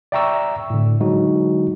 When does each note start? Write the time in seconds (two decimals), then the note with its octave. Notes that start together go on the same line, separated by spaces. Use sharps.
0.12 D5 E5 G5 A#5 C#6 E6
0.70 A2 D3
1.00 D3 F#3 G#3 D#4 F#4